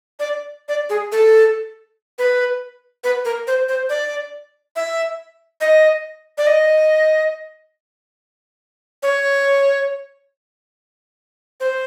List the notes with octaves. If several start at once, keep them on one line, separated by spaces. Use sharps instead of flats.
D5
D5
G#4
A4
B4
B4
A#4
C5
C5
D5
E5
D#5
D5
D#5
C#5
C5